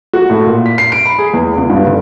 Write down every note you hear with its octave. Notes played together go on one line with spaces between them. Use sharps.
F#4
A2
A#2
B6
C7
D7
B5
G#4
E2
C#2
G2
G1